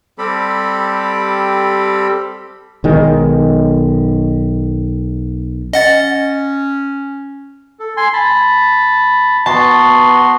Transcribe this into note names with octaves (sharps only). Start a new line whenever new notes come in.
G3 C4 G4 A4 B5
B1 D#3 G#3
C#4 D#5 F#5 A6
A4
G#5 C6
A5 B5
B3 F#4 A5 C6